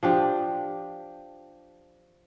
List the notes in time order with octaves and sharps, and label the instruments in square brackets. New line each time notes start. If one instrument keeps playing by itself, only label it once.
[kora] F3 D4 G4